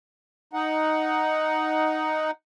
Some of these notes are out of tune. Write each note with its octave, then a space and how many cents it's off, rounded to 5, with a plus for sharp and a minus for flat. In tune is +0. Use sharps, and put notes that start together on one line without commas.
D#4 +0 F#5 +5